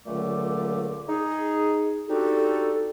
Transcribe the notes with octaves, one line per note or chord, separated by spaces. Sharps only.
C#2 A#2 D3 F#3 A3 D6
D#4 G#4
C4 D4 D#4 F#4 G4 A4